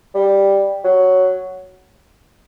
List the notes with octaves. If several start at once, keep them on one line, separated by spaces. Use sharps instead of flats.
G3
F#3